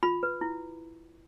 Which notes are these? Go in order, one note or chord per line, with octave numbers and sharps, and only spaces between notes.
F4 B5
B4
E4